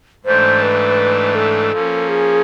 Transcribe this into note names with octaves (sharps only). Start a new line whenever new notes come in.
G#2 E3 A3 D4 C5
B4
A4
F3 A#3 C#4
G#4